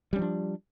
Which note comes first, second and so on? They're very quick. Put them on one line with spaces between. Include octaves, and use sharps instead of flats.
G3 C#4 F3 D4